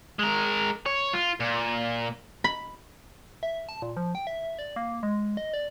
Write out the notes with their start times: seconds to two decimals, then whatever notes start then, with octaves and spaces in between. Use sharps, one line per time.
0.19 G#3 A#4
0.86 C#5
1.13 F4
1.40 A#2
2.44 B5
3.43 E5
3.69 A5
3.82 A#2
3.97 F3
4.15 G5
4.27 E5
4.59 D5
4.76 A#3
5.03 G#3
5.37 D#5
5.54 D5